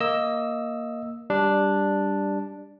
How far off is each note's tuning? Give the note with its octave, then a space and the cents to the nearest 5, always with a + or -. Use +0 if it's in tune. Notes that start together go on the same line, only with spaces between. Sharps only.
A#3 +0 D#5 +10 E6 +0
G3 +5 D4 +0